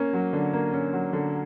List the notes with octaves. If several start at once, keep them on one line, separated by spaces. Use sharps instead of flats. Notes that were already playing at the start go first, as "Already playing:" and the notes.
Already playing: A#3 C#4
F#3
D3
A#3
C#4
F#3
D3